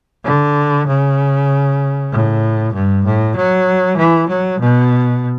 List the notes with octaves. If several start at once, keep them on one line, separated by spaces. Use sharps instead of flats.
D3
C#3
A2
G2
A2
F#3
E3
F#3
B2